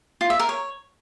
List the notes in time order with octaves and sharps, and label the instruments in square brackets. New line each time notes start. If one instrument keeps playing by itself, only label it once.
[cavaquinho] F4
E5
A#4
C#5